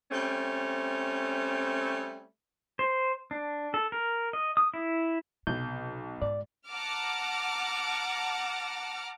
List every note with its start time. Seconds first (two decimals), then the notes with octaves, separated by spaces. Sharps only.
0.11 G3 A3 C4 C#4
2.79 C5
3.31 D4
3.74 A4
3.92 A#4
4.33 D#5
4.57 D#6
4.74 E4
5.47 B1 C3 G6
6.22 G#2 D5
6.67 F#5 A5 A#5 D6 F6